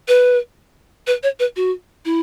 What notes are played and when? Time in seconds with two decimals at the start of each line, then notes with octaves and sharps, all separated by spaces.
0.08 B4
1.07 B4
1.23 C#5
1.40 B4
1.56 F#4
2.05 E4